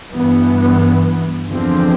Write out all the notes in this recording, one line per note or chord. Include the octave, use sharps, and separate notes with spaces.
G2 E3 B3
E2 D3 F3 C4